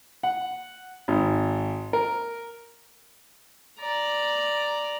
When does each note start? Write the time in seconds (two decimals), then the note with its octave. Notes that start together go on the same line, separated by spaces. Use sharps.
0.23 F#5
1.08 G#1
1.93 A#4
3.81 D5 A#5